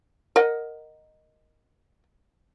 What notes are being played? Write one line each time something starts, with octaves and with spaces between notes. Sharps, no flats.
A#4 D#5 F#5